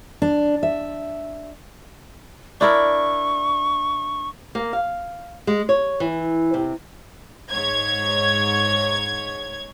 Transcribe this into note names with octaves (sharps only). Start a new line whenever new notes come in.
D4
E5
D4 E4 A#4 C#6
A#3
F5
G#3
C#5
E3
C3
G#2 C#5 G#6